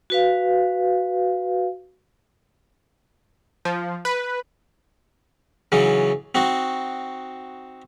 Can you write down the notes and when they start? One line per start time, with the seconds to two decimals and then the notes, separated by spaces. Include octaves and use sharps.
0.10 F#4 B4 F5
3.65 F3
4.05 B4
5.72 C#3 E3 F#3 D#4
6.35 C4 D#4 F#4